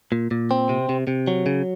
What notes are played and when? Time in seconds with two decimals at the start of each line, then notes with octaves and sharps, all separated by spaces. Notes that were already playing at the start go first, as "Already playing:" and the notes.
0.12 A#2
0.31 A#2
0.51 C4
0.69 C3
0.89 C3
1.07 C3
1.28 F#3
1.46 C#3